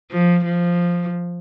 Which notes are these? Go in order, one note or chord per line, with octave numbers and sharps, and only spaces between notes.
F3
F3